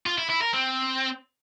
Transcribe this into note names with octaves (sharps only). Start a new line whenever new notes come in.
F4
E4
E4
A#4
C4